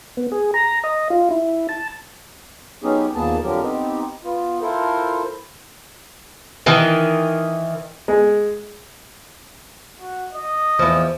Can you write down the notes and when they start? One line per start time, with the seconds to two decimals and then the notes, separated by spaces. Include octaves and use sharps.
0.17 B3
0.32 G#4
0.54 A#5
0.84 D#5
1.10 F4
1.31 E4
1.69 A5
2.83 F#3 B3 C#4 D#4 G4 G#4
3.15 D#2 A#2 A#3 B3 G#4 A5
3.43 F2 D3 F3 F#3 G4 A#4
3.61 B3 C4 D#4 G4
4.24 B3 F4
4.61 E4 F4 A4 A#4 C5
6.66 D#3 E3
8.08 G#3
10.00 F#4
10.33 D#5
10.79 E2 F3